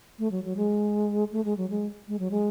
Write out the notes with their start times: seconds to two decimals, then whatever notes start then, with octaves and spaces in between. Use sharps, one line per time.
0.19 A3
0.31 F#3
0.44 F#3
0.57 G#3
1.32 A3
1.45 G#3
1.57 F#3
1.70 G#3
2.08 G#3
2.19 F#3
2.31 G#3